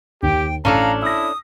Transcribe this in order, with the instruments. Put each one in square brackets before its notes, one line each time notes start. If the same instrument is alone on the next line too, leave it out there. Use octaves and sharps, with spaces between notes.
[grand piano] D#2 [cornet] G4 [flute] G5
[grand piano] A1 A5 [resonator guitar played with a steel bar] C#4 D4 A4 [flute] F5 [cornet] A#5
[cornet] E4 [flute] D#6 [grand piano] E6 A#6